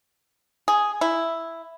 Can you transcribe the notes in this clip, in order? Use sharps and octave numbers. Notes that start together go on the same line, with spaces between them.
G#4
E4